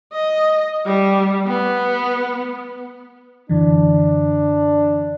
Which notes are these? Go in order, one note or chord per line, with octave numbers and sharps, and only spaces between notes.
D#5
G3
B3
F#2 D3 E3 D4